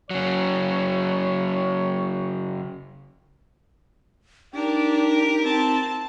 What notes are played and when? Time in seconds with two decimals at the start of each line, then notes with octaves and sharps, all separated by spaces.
0.10 C#3 F#3 C#5
4.54 D4 D#4 G4 A#4
5.43 C4 A5